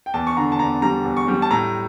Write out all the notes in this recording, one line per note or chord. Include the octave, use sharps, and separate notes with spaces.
G5
E2 A5
C#6
D3 A#5
A5
E2 A#5
G3 A#5
E2
C#6
G3
A5
A2 A#5